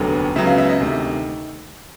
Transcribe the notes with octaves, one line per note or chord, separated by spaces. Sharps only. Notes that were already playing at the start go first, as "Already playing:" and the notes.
Already playing: F1 D#2 D3 F#3 B3
C#2 C#3 F#3 B3 E5
F5
E5
D#5
D2 C3 D#3